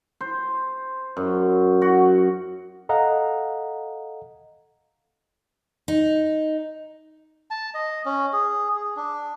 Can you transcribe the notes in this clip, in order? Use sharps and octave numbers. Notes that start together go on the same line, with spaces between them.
C5
F#2
F#4
A4 D#5 F5 F#5 A#5
D#4
A5
D#5
C#4
G#4
G#4
D4